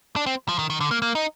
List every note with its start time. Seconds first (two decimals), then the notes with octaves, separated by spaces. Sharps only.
0.16 D4
0.26 C4
0.49 F3
0.59 D#3
0.70 D#3
0.81 D3
0.91 A#3
1.02 A#3
1.15 D#4